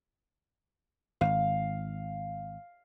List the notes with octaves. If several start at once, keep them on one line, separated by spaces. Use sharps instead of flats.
G#1 F5